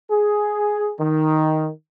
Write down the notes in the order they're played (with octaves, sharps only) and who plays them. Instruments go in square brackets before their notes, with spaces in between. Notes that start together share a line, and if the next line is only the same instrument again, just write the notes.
[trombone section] G#4
D#3